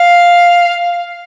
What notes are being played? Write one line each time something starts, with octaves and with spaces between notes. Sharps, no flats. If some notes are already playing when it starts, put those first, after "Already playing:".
Already playing: F5